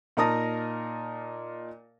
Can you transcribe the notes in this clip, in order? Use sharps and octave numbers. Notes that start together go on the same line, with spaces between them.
A#2 D#4 A#4 A5 D#6 A#6